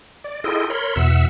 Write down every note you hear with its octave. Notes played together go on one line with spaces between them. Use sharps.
D5
E4 F4 G#4 A4 D#5 G5
A#4 C#5 B5 C6
E2 B2 E5 F#5 E6